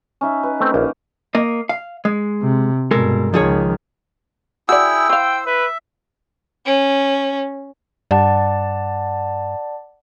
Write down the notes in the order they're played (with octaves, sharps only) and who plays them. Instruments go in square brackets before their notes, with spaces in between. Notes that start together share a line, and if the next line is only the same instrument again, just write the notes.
[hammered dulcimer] C#4 D#4 E5
B4
[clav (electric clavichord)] A3 C4 G5
[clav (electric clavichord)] A#1 [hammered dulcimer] D#3 A#3
[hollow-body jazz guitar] A#3 D#5
F5
G#3
[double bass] C3
[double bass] G2 B2 [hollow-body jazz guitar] G#3 A4 A#4
[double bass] C#2 D#3 [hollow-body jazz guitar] F3 G#4 C#5
[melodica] E4 G#4 G5 [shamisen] F#4 D5 [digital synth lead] E6
[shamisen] E3 F5 [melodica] C5 [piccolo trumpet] G5
[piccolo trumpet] B4 [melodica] E5
[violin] C#4
[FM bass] G2 [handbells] D5 F#5 A5